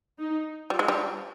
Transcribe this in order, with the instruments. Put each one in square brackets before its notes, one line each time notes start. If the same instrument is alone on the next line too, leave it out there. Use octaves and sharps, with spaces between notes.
[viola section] D#4
[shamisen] G3 [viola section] F4
[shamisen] G#3
G3